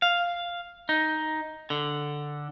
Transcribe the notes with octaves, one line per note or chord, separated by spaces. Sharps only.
F5
D#4
D3